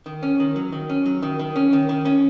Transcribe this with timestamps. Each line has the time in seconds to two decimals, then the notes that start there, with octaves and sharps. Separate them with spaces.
0.06 D#3
0.23 C#4
0.40 D#3
0.56 F#3
0.72 D#3
0.90 C#4
1.06 F#3
1.22 D#3
1.39 D#3
1.56 C#4
1.73 D#3
1.89 D#3
2.05 C#4